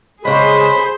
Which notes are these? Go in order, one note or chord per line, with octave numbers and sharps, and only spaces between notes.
C#3 G#3 G#4 C5 B5